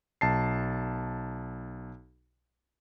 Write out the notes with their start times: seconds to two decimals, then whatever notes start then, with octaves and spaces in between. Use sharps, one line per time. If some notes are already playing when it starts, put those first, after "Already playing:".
0.21 B1 A5 C7